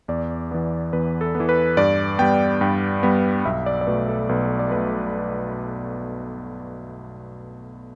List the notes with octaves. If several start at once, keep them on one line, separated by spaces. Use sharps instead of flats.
E2 D5
E3 B3
E2 B4
A4
B3
E3
B4
G2 D5
G3 B3 G5
G2 G5
G3 B3
B1 E5
D5
D5
B2 A3 B4
A4
B1 B4
D5
B2 A3 B4